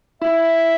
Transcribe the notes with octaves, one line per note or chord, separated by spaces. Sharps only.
E4 E5